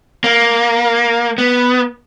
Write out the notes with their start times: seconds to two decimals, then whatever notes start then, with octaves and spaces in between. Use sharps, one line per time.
0.24 A#3
1.38 B3